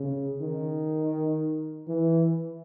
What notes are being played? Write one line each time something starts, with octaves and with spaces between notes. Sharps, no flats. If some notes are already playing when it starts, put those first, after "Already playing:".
Already playing: C#3
D#3
E3